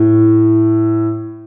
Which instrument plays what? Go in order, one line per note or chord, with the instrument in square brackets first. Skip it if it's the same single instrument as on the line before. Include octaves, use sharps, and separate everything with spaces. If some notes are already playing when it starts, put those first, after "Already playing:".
Already playing: [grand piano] A2